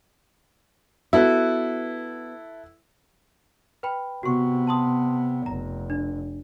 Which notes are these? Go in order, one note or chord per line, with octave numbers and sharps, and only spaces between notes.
B3 E4 F#4 A4 B4
B4 G5 B5
C3 B3 F#4 C#6
A5 C6 D#6
F1 A#5
D4